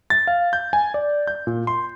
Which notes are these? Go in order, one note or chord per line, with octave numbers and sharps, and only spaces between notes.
A6
F5
G6
G#5
D5
G6
A#2
C6